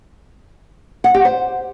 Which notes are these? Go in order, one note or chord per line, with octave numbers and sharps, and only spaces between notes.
F#5
G4
C5